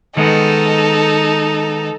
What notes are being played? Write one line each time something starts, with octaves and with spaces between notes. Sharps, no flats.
D#3 G#3 B3 D#4 A4